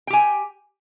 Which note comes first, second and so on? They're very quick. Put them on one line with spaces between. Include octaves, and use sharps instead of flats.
G5 G4 G#5